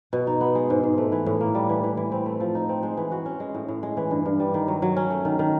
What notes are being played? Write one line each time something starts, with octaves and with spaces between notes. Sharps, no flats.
B2
D#4
B3
G#3
G#2
G#2
A3
E3
A2
A#3
G3
E3
E3
E3
C4
A3
F3
D#4
C4
G#3
E3
F#4
C#4
G#3
A2
A2
G#3
E3
G2
G2
G3
D#3
F#3
F#3
C#4
A3
D#3
D#3